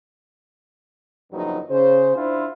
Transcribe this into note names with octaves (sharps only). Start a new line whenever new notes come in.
F#1 E2 G2 F3 F#3 D#4
C#3 C5
D4 E4 F4 C5